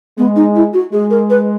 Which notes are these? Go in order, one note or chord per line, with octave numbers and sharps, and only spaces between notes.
G#3 B3
D#4
E4
F#4
G#3 G#4
A#4
B4